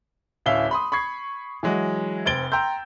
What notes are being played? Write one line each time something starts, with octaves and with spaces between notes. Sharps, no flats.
D1 C#4 E4 E5 F5 G7
B5 C6 D#6
B5 C#6 G#6 C7
E3 F#3 G#3 F#4
F1 C4 G#6 A6 D7 G7
G5 A#5 C6 E6 G6